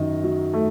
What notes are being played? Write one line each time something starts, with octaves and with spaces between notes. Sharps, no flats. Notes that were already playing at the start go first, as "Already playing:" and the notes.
Already playing: F#2 D#3 D#5
F#3
A3